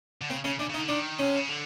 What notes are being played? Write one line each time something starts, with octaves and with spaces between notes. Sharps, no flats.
D3
C#3 C4
C#3 C#4
C#3 D4
C#3
D#4
D3
D#3 D4
C3 C#4
C#3
D3